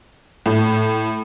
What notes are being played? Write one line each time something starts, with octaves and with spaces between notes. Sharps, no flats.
A2